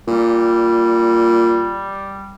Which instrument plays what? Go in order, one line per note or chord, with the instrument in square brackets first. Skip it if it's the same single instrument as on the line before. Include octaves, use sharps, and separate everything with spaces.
[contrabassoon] A#2 [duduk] G3